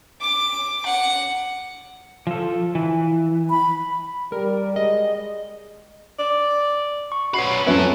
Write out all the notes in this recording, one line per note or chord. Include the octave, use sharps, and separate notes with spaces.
D6
F#5
F3 A4
E3
B5
G3 A#4
G#3 D#5
D5
C#6
C#4 F#4 B4 C7
F2 F#3 C#4 E4 A4 B4